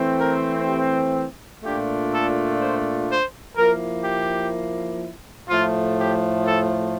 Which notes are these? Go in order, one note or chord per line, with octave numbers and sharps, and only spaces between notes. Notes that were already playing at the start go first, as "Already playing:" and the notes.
Already playing: E3 A3 C4
A#4
G4
A#2 A3 D4 F4 G4
A4
C5
C5
F3 A#3 E4 A#4
G4
A2 F3 A3 F4
G4
A4